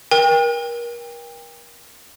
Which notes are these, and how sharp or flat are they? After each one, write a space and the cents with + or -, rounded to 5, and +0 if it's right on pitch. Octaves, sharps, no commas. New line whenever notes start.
A#4 +30 G5 +35